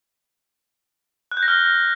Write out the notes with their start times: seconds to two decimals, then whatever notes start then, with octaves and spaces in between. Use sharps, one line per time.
1.31 F#6
1.37 G6
1.43 A#6
1.48 F6